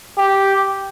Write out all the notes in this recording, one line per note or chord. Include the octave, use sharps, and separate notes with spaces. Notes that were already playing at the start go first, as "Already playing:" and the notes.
G4